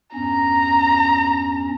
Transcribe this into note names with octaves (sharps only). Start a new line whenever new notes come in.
E2 G2 C#4 A#5